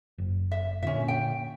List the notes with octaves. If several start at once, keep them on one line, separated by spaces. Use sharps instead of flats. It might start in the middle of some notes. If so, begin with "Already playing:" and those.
F#1
E5
A#2 D3 C#4 E5
G5